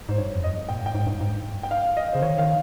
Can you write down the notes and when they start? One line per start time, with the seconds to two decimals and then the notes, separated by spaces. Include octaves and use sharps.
0.09 G#2 C5
0.18 G2 C#5
0.35 F2
0.44 D#5
0.52 G2
0.69 A#2 G5
0.82 G#2
0.86 G5
0.95 G#2
1.07 G2
1.21 G#2
1.37 G2
1.63 G5
1.71 F5
1.97 D#5
2.13 C#3 C5
2.22 D#3 C#5
2.38 D#3 F5